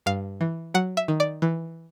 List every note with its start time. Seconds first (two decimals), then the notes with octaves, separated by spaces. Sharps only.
0.06 G2 F5
0.41 E3
0.74 F#3 F#5
0.97 E5
1.08 D#3
1.20 D5
1.42 E3